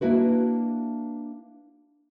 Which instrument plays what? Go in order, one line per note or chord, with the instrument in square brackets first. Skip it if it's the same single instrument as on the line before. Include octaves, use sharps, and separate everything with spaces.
[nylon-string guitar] A#3 D4 E4 F#4 B4